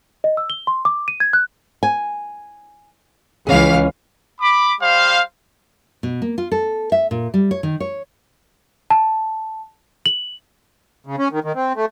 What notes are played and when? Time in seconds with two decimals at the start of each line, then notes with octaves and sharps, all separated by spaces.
0.24 D#5
0.37 E6
0.50 G7
0.67 C6
0.85 D6
1.08 D#7
1.20 G#6
1.33 F#6
1.83 G#5
3.47 C#2 E3 C#4 G#4 F5
4.41 B5 D6
4.81 G3 C5 F5
6.03 B2
6.22 A#3
6.38 F4
6.52 A4
6.92 E5
7.11 A#2
7.34 G3
7.51 C#5
7.63 D#3
7.80 C#5
8.90 A5
10.06 F#7
11.07 C#3
11.18 C#4
11.32 D#3
11.44 D#3
11.55 C4
11.76 A3